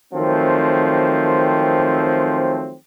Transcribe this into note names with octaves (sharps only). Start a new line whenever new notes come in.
D#3 F3 F#3 A3 C4